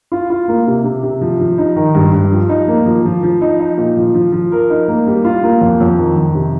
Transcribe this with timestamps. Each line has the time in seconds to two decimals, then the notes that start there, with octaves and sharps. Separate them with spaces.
0.12 F4
0.30 F4
0.48 A#3
0.67 C3
0.84 C3
1.03 C3
1.21 F3
1.40 F3
1.58 D#4
1.76 D#3
1.95 G2
2.13 G2
2.31 F3
2.49 D#4
2.68 A#3
2.86 F3
3.05 F3
3.23 F3
3.41 D#4
3.60 D#4
3.78 A#2
3.97 F3
4.14 F3
4.33 F3
4.52 A#4
4.70 D#4
4.88 A#3
5.07 G3
5.25 F4
5.43 A#3
5.61 F2
5.80 F2
5.98 D#3
6.16 F2
6.35 C3